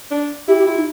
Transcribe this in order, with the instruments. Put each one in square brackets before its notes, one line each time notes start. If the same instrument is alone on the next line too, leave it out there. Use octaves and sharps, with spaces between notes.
[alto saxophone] D4
[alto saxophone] E4 [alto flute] G4
[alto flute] G4
[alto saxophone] E4 [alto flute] F4
[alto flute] D#4